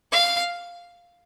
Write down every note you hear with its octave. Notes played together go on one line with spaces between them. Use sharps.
F5